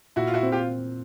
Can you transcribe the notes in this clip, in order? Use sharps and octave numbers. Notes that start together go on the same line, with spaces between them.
A#2 E4 F#4
F4
E4 F#4
C4
F4 G4